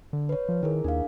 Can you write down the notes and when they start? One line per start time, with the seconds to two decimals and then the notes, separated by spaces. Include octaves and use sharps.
0.13 D3
0.29 B4 C#5
0.49 F3
0.63 D#3 E4 G#4 A#4
0.84 D#2 D4 F5